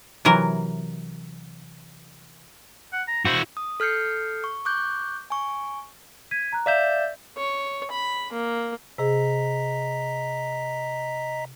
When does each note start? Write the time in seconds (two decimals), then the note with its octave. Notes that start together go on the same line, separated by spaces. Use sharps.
0.25 C3 E3 F#3 A#4
2.93 F#5
3.08 A#5
3.25 E4 F#4 C5
3.57 D#6
3.80 A4 F6 G6 C7 C#7
4.44 C#6
4.65 C#6 D6 F#6 G6
5.30 G#5 C#6
6.31 G#6 B6 D#7
6.53 A#5 F#6
6.66 D5 E5 F5 G6 E7
7.37 C#5
7.91 B5
8.32 A#3
8.98 C3 G#4 D#5 A#5 B6